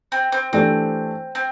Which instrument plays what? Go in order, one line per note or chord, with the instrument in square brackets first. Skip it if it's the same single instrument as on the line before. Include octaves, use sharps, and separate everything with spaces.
[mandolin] C4
C4
[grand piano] E3 A3 D4 G4 [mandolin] C4
[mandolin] C4